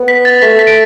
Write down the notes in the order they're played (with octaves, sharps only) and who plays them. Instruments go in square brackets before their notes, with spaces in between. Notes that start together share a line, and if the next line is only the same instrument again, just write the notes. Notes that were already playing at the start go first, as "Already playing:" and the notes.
Already playing: [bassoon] B3
[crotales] B6
A6
[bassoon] A3 [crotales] B6
[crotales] B6
D7